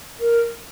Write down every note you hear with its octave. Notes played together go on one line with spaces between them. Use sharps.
A#4